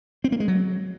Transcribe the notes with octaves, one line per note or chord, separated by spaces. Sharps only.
C4
A#3
G#3
F#3